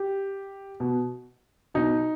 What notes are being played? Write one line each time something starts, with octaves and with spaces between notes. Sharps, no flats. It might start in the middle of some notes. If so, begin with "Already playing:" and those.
Already playing: G4
B2
B2 D#4